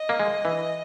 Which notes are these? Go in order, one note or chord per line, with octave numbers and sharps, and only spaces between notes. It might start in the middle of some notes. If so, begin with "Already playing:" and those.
Already playing: D#5
A#3
G#3
E3